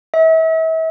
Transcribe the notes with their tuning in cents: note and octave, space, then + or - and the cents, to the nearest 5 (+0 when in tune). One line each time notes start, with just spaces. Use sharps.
E5 -35